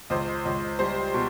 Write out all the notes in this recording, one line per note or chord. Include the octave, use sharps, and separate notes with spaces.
C#2 C5
C#2
G3 C5
B2